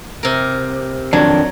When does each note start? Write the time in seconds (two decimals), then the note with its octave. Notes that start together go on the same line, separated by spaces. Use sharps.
0.23 C3 A#4
1.13 F2 D#3 F#3 D4